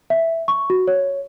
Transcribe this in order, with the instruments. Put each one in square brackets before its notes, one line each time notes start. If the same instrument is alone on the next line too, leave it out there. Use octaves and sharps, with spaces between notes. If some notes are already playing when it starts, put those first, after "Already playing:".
[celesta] E5
C#6
F#4
C#5